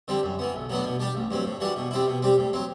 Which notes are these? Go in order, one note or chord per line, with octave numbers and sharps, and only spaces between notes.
D3 G3 C4
F#2
E3 B3
B1
A2 F#3 B3 D4
B2
G3 D4 G4
A1
G2 F#3 C4
A2
E3 G3 D4 F#4
B2
G3 C4 E4
B2
G3 C4 G4
A2
F#3 C4